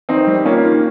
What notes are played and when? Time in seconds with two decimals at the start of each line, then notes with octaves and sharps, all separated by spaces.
0.09 D#3 C4 D#4
0.27 G3
0.45 A#3 C#4 F4
0.64 D#3